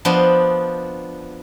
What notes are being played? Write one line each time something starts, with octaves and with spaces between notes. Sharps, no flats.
F3 B3 D4 C5 D#5